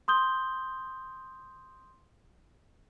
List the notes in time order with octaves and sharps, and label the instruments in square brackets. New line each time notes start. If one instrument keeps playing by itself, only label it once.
[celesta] C6 D#6 G6 G7